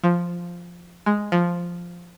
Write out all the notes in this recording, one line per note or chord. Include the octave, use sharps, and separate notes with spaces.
F3
G#3
F3